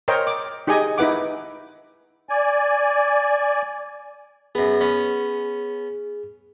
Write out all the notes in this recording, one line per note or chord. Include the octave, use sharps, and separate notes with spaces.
A#4 C5 C#5 D#5 G5
D6
D#4 G4 G#4 D#5 G#5
D#4 E4 B4 F#5 D6
D5 G#5
F#2 B3 G#4
B3 C#4